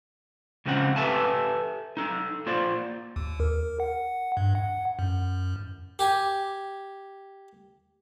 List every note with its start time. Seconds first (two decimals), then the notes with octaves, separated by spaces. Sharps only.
0.65 C#2 C#3 F3 C4 D#4 F#5
0.96 G4 A4 B4 E5 G#5 A5
1.97 D#4 A4
2.46 A#3 F4 C5 D5
3.16 D#2
3.40 A#4
3.80 F#5
4.37 G2
4.55 F#5
4.99 F#2
5.99 G4 G#5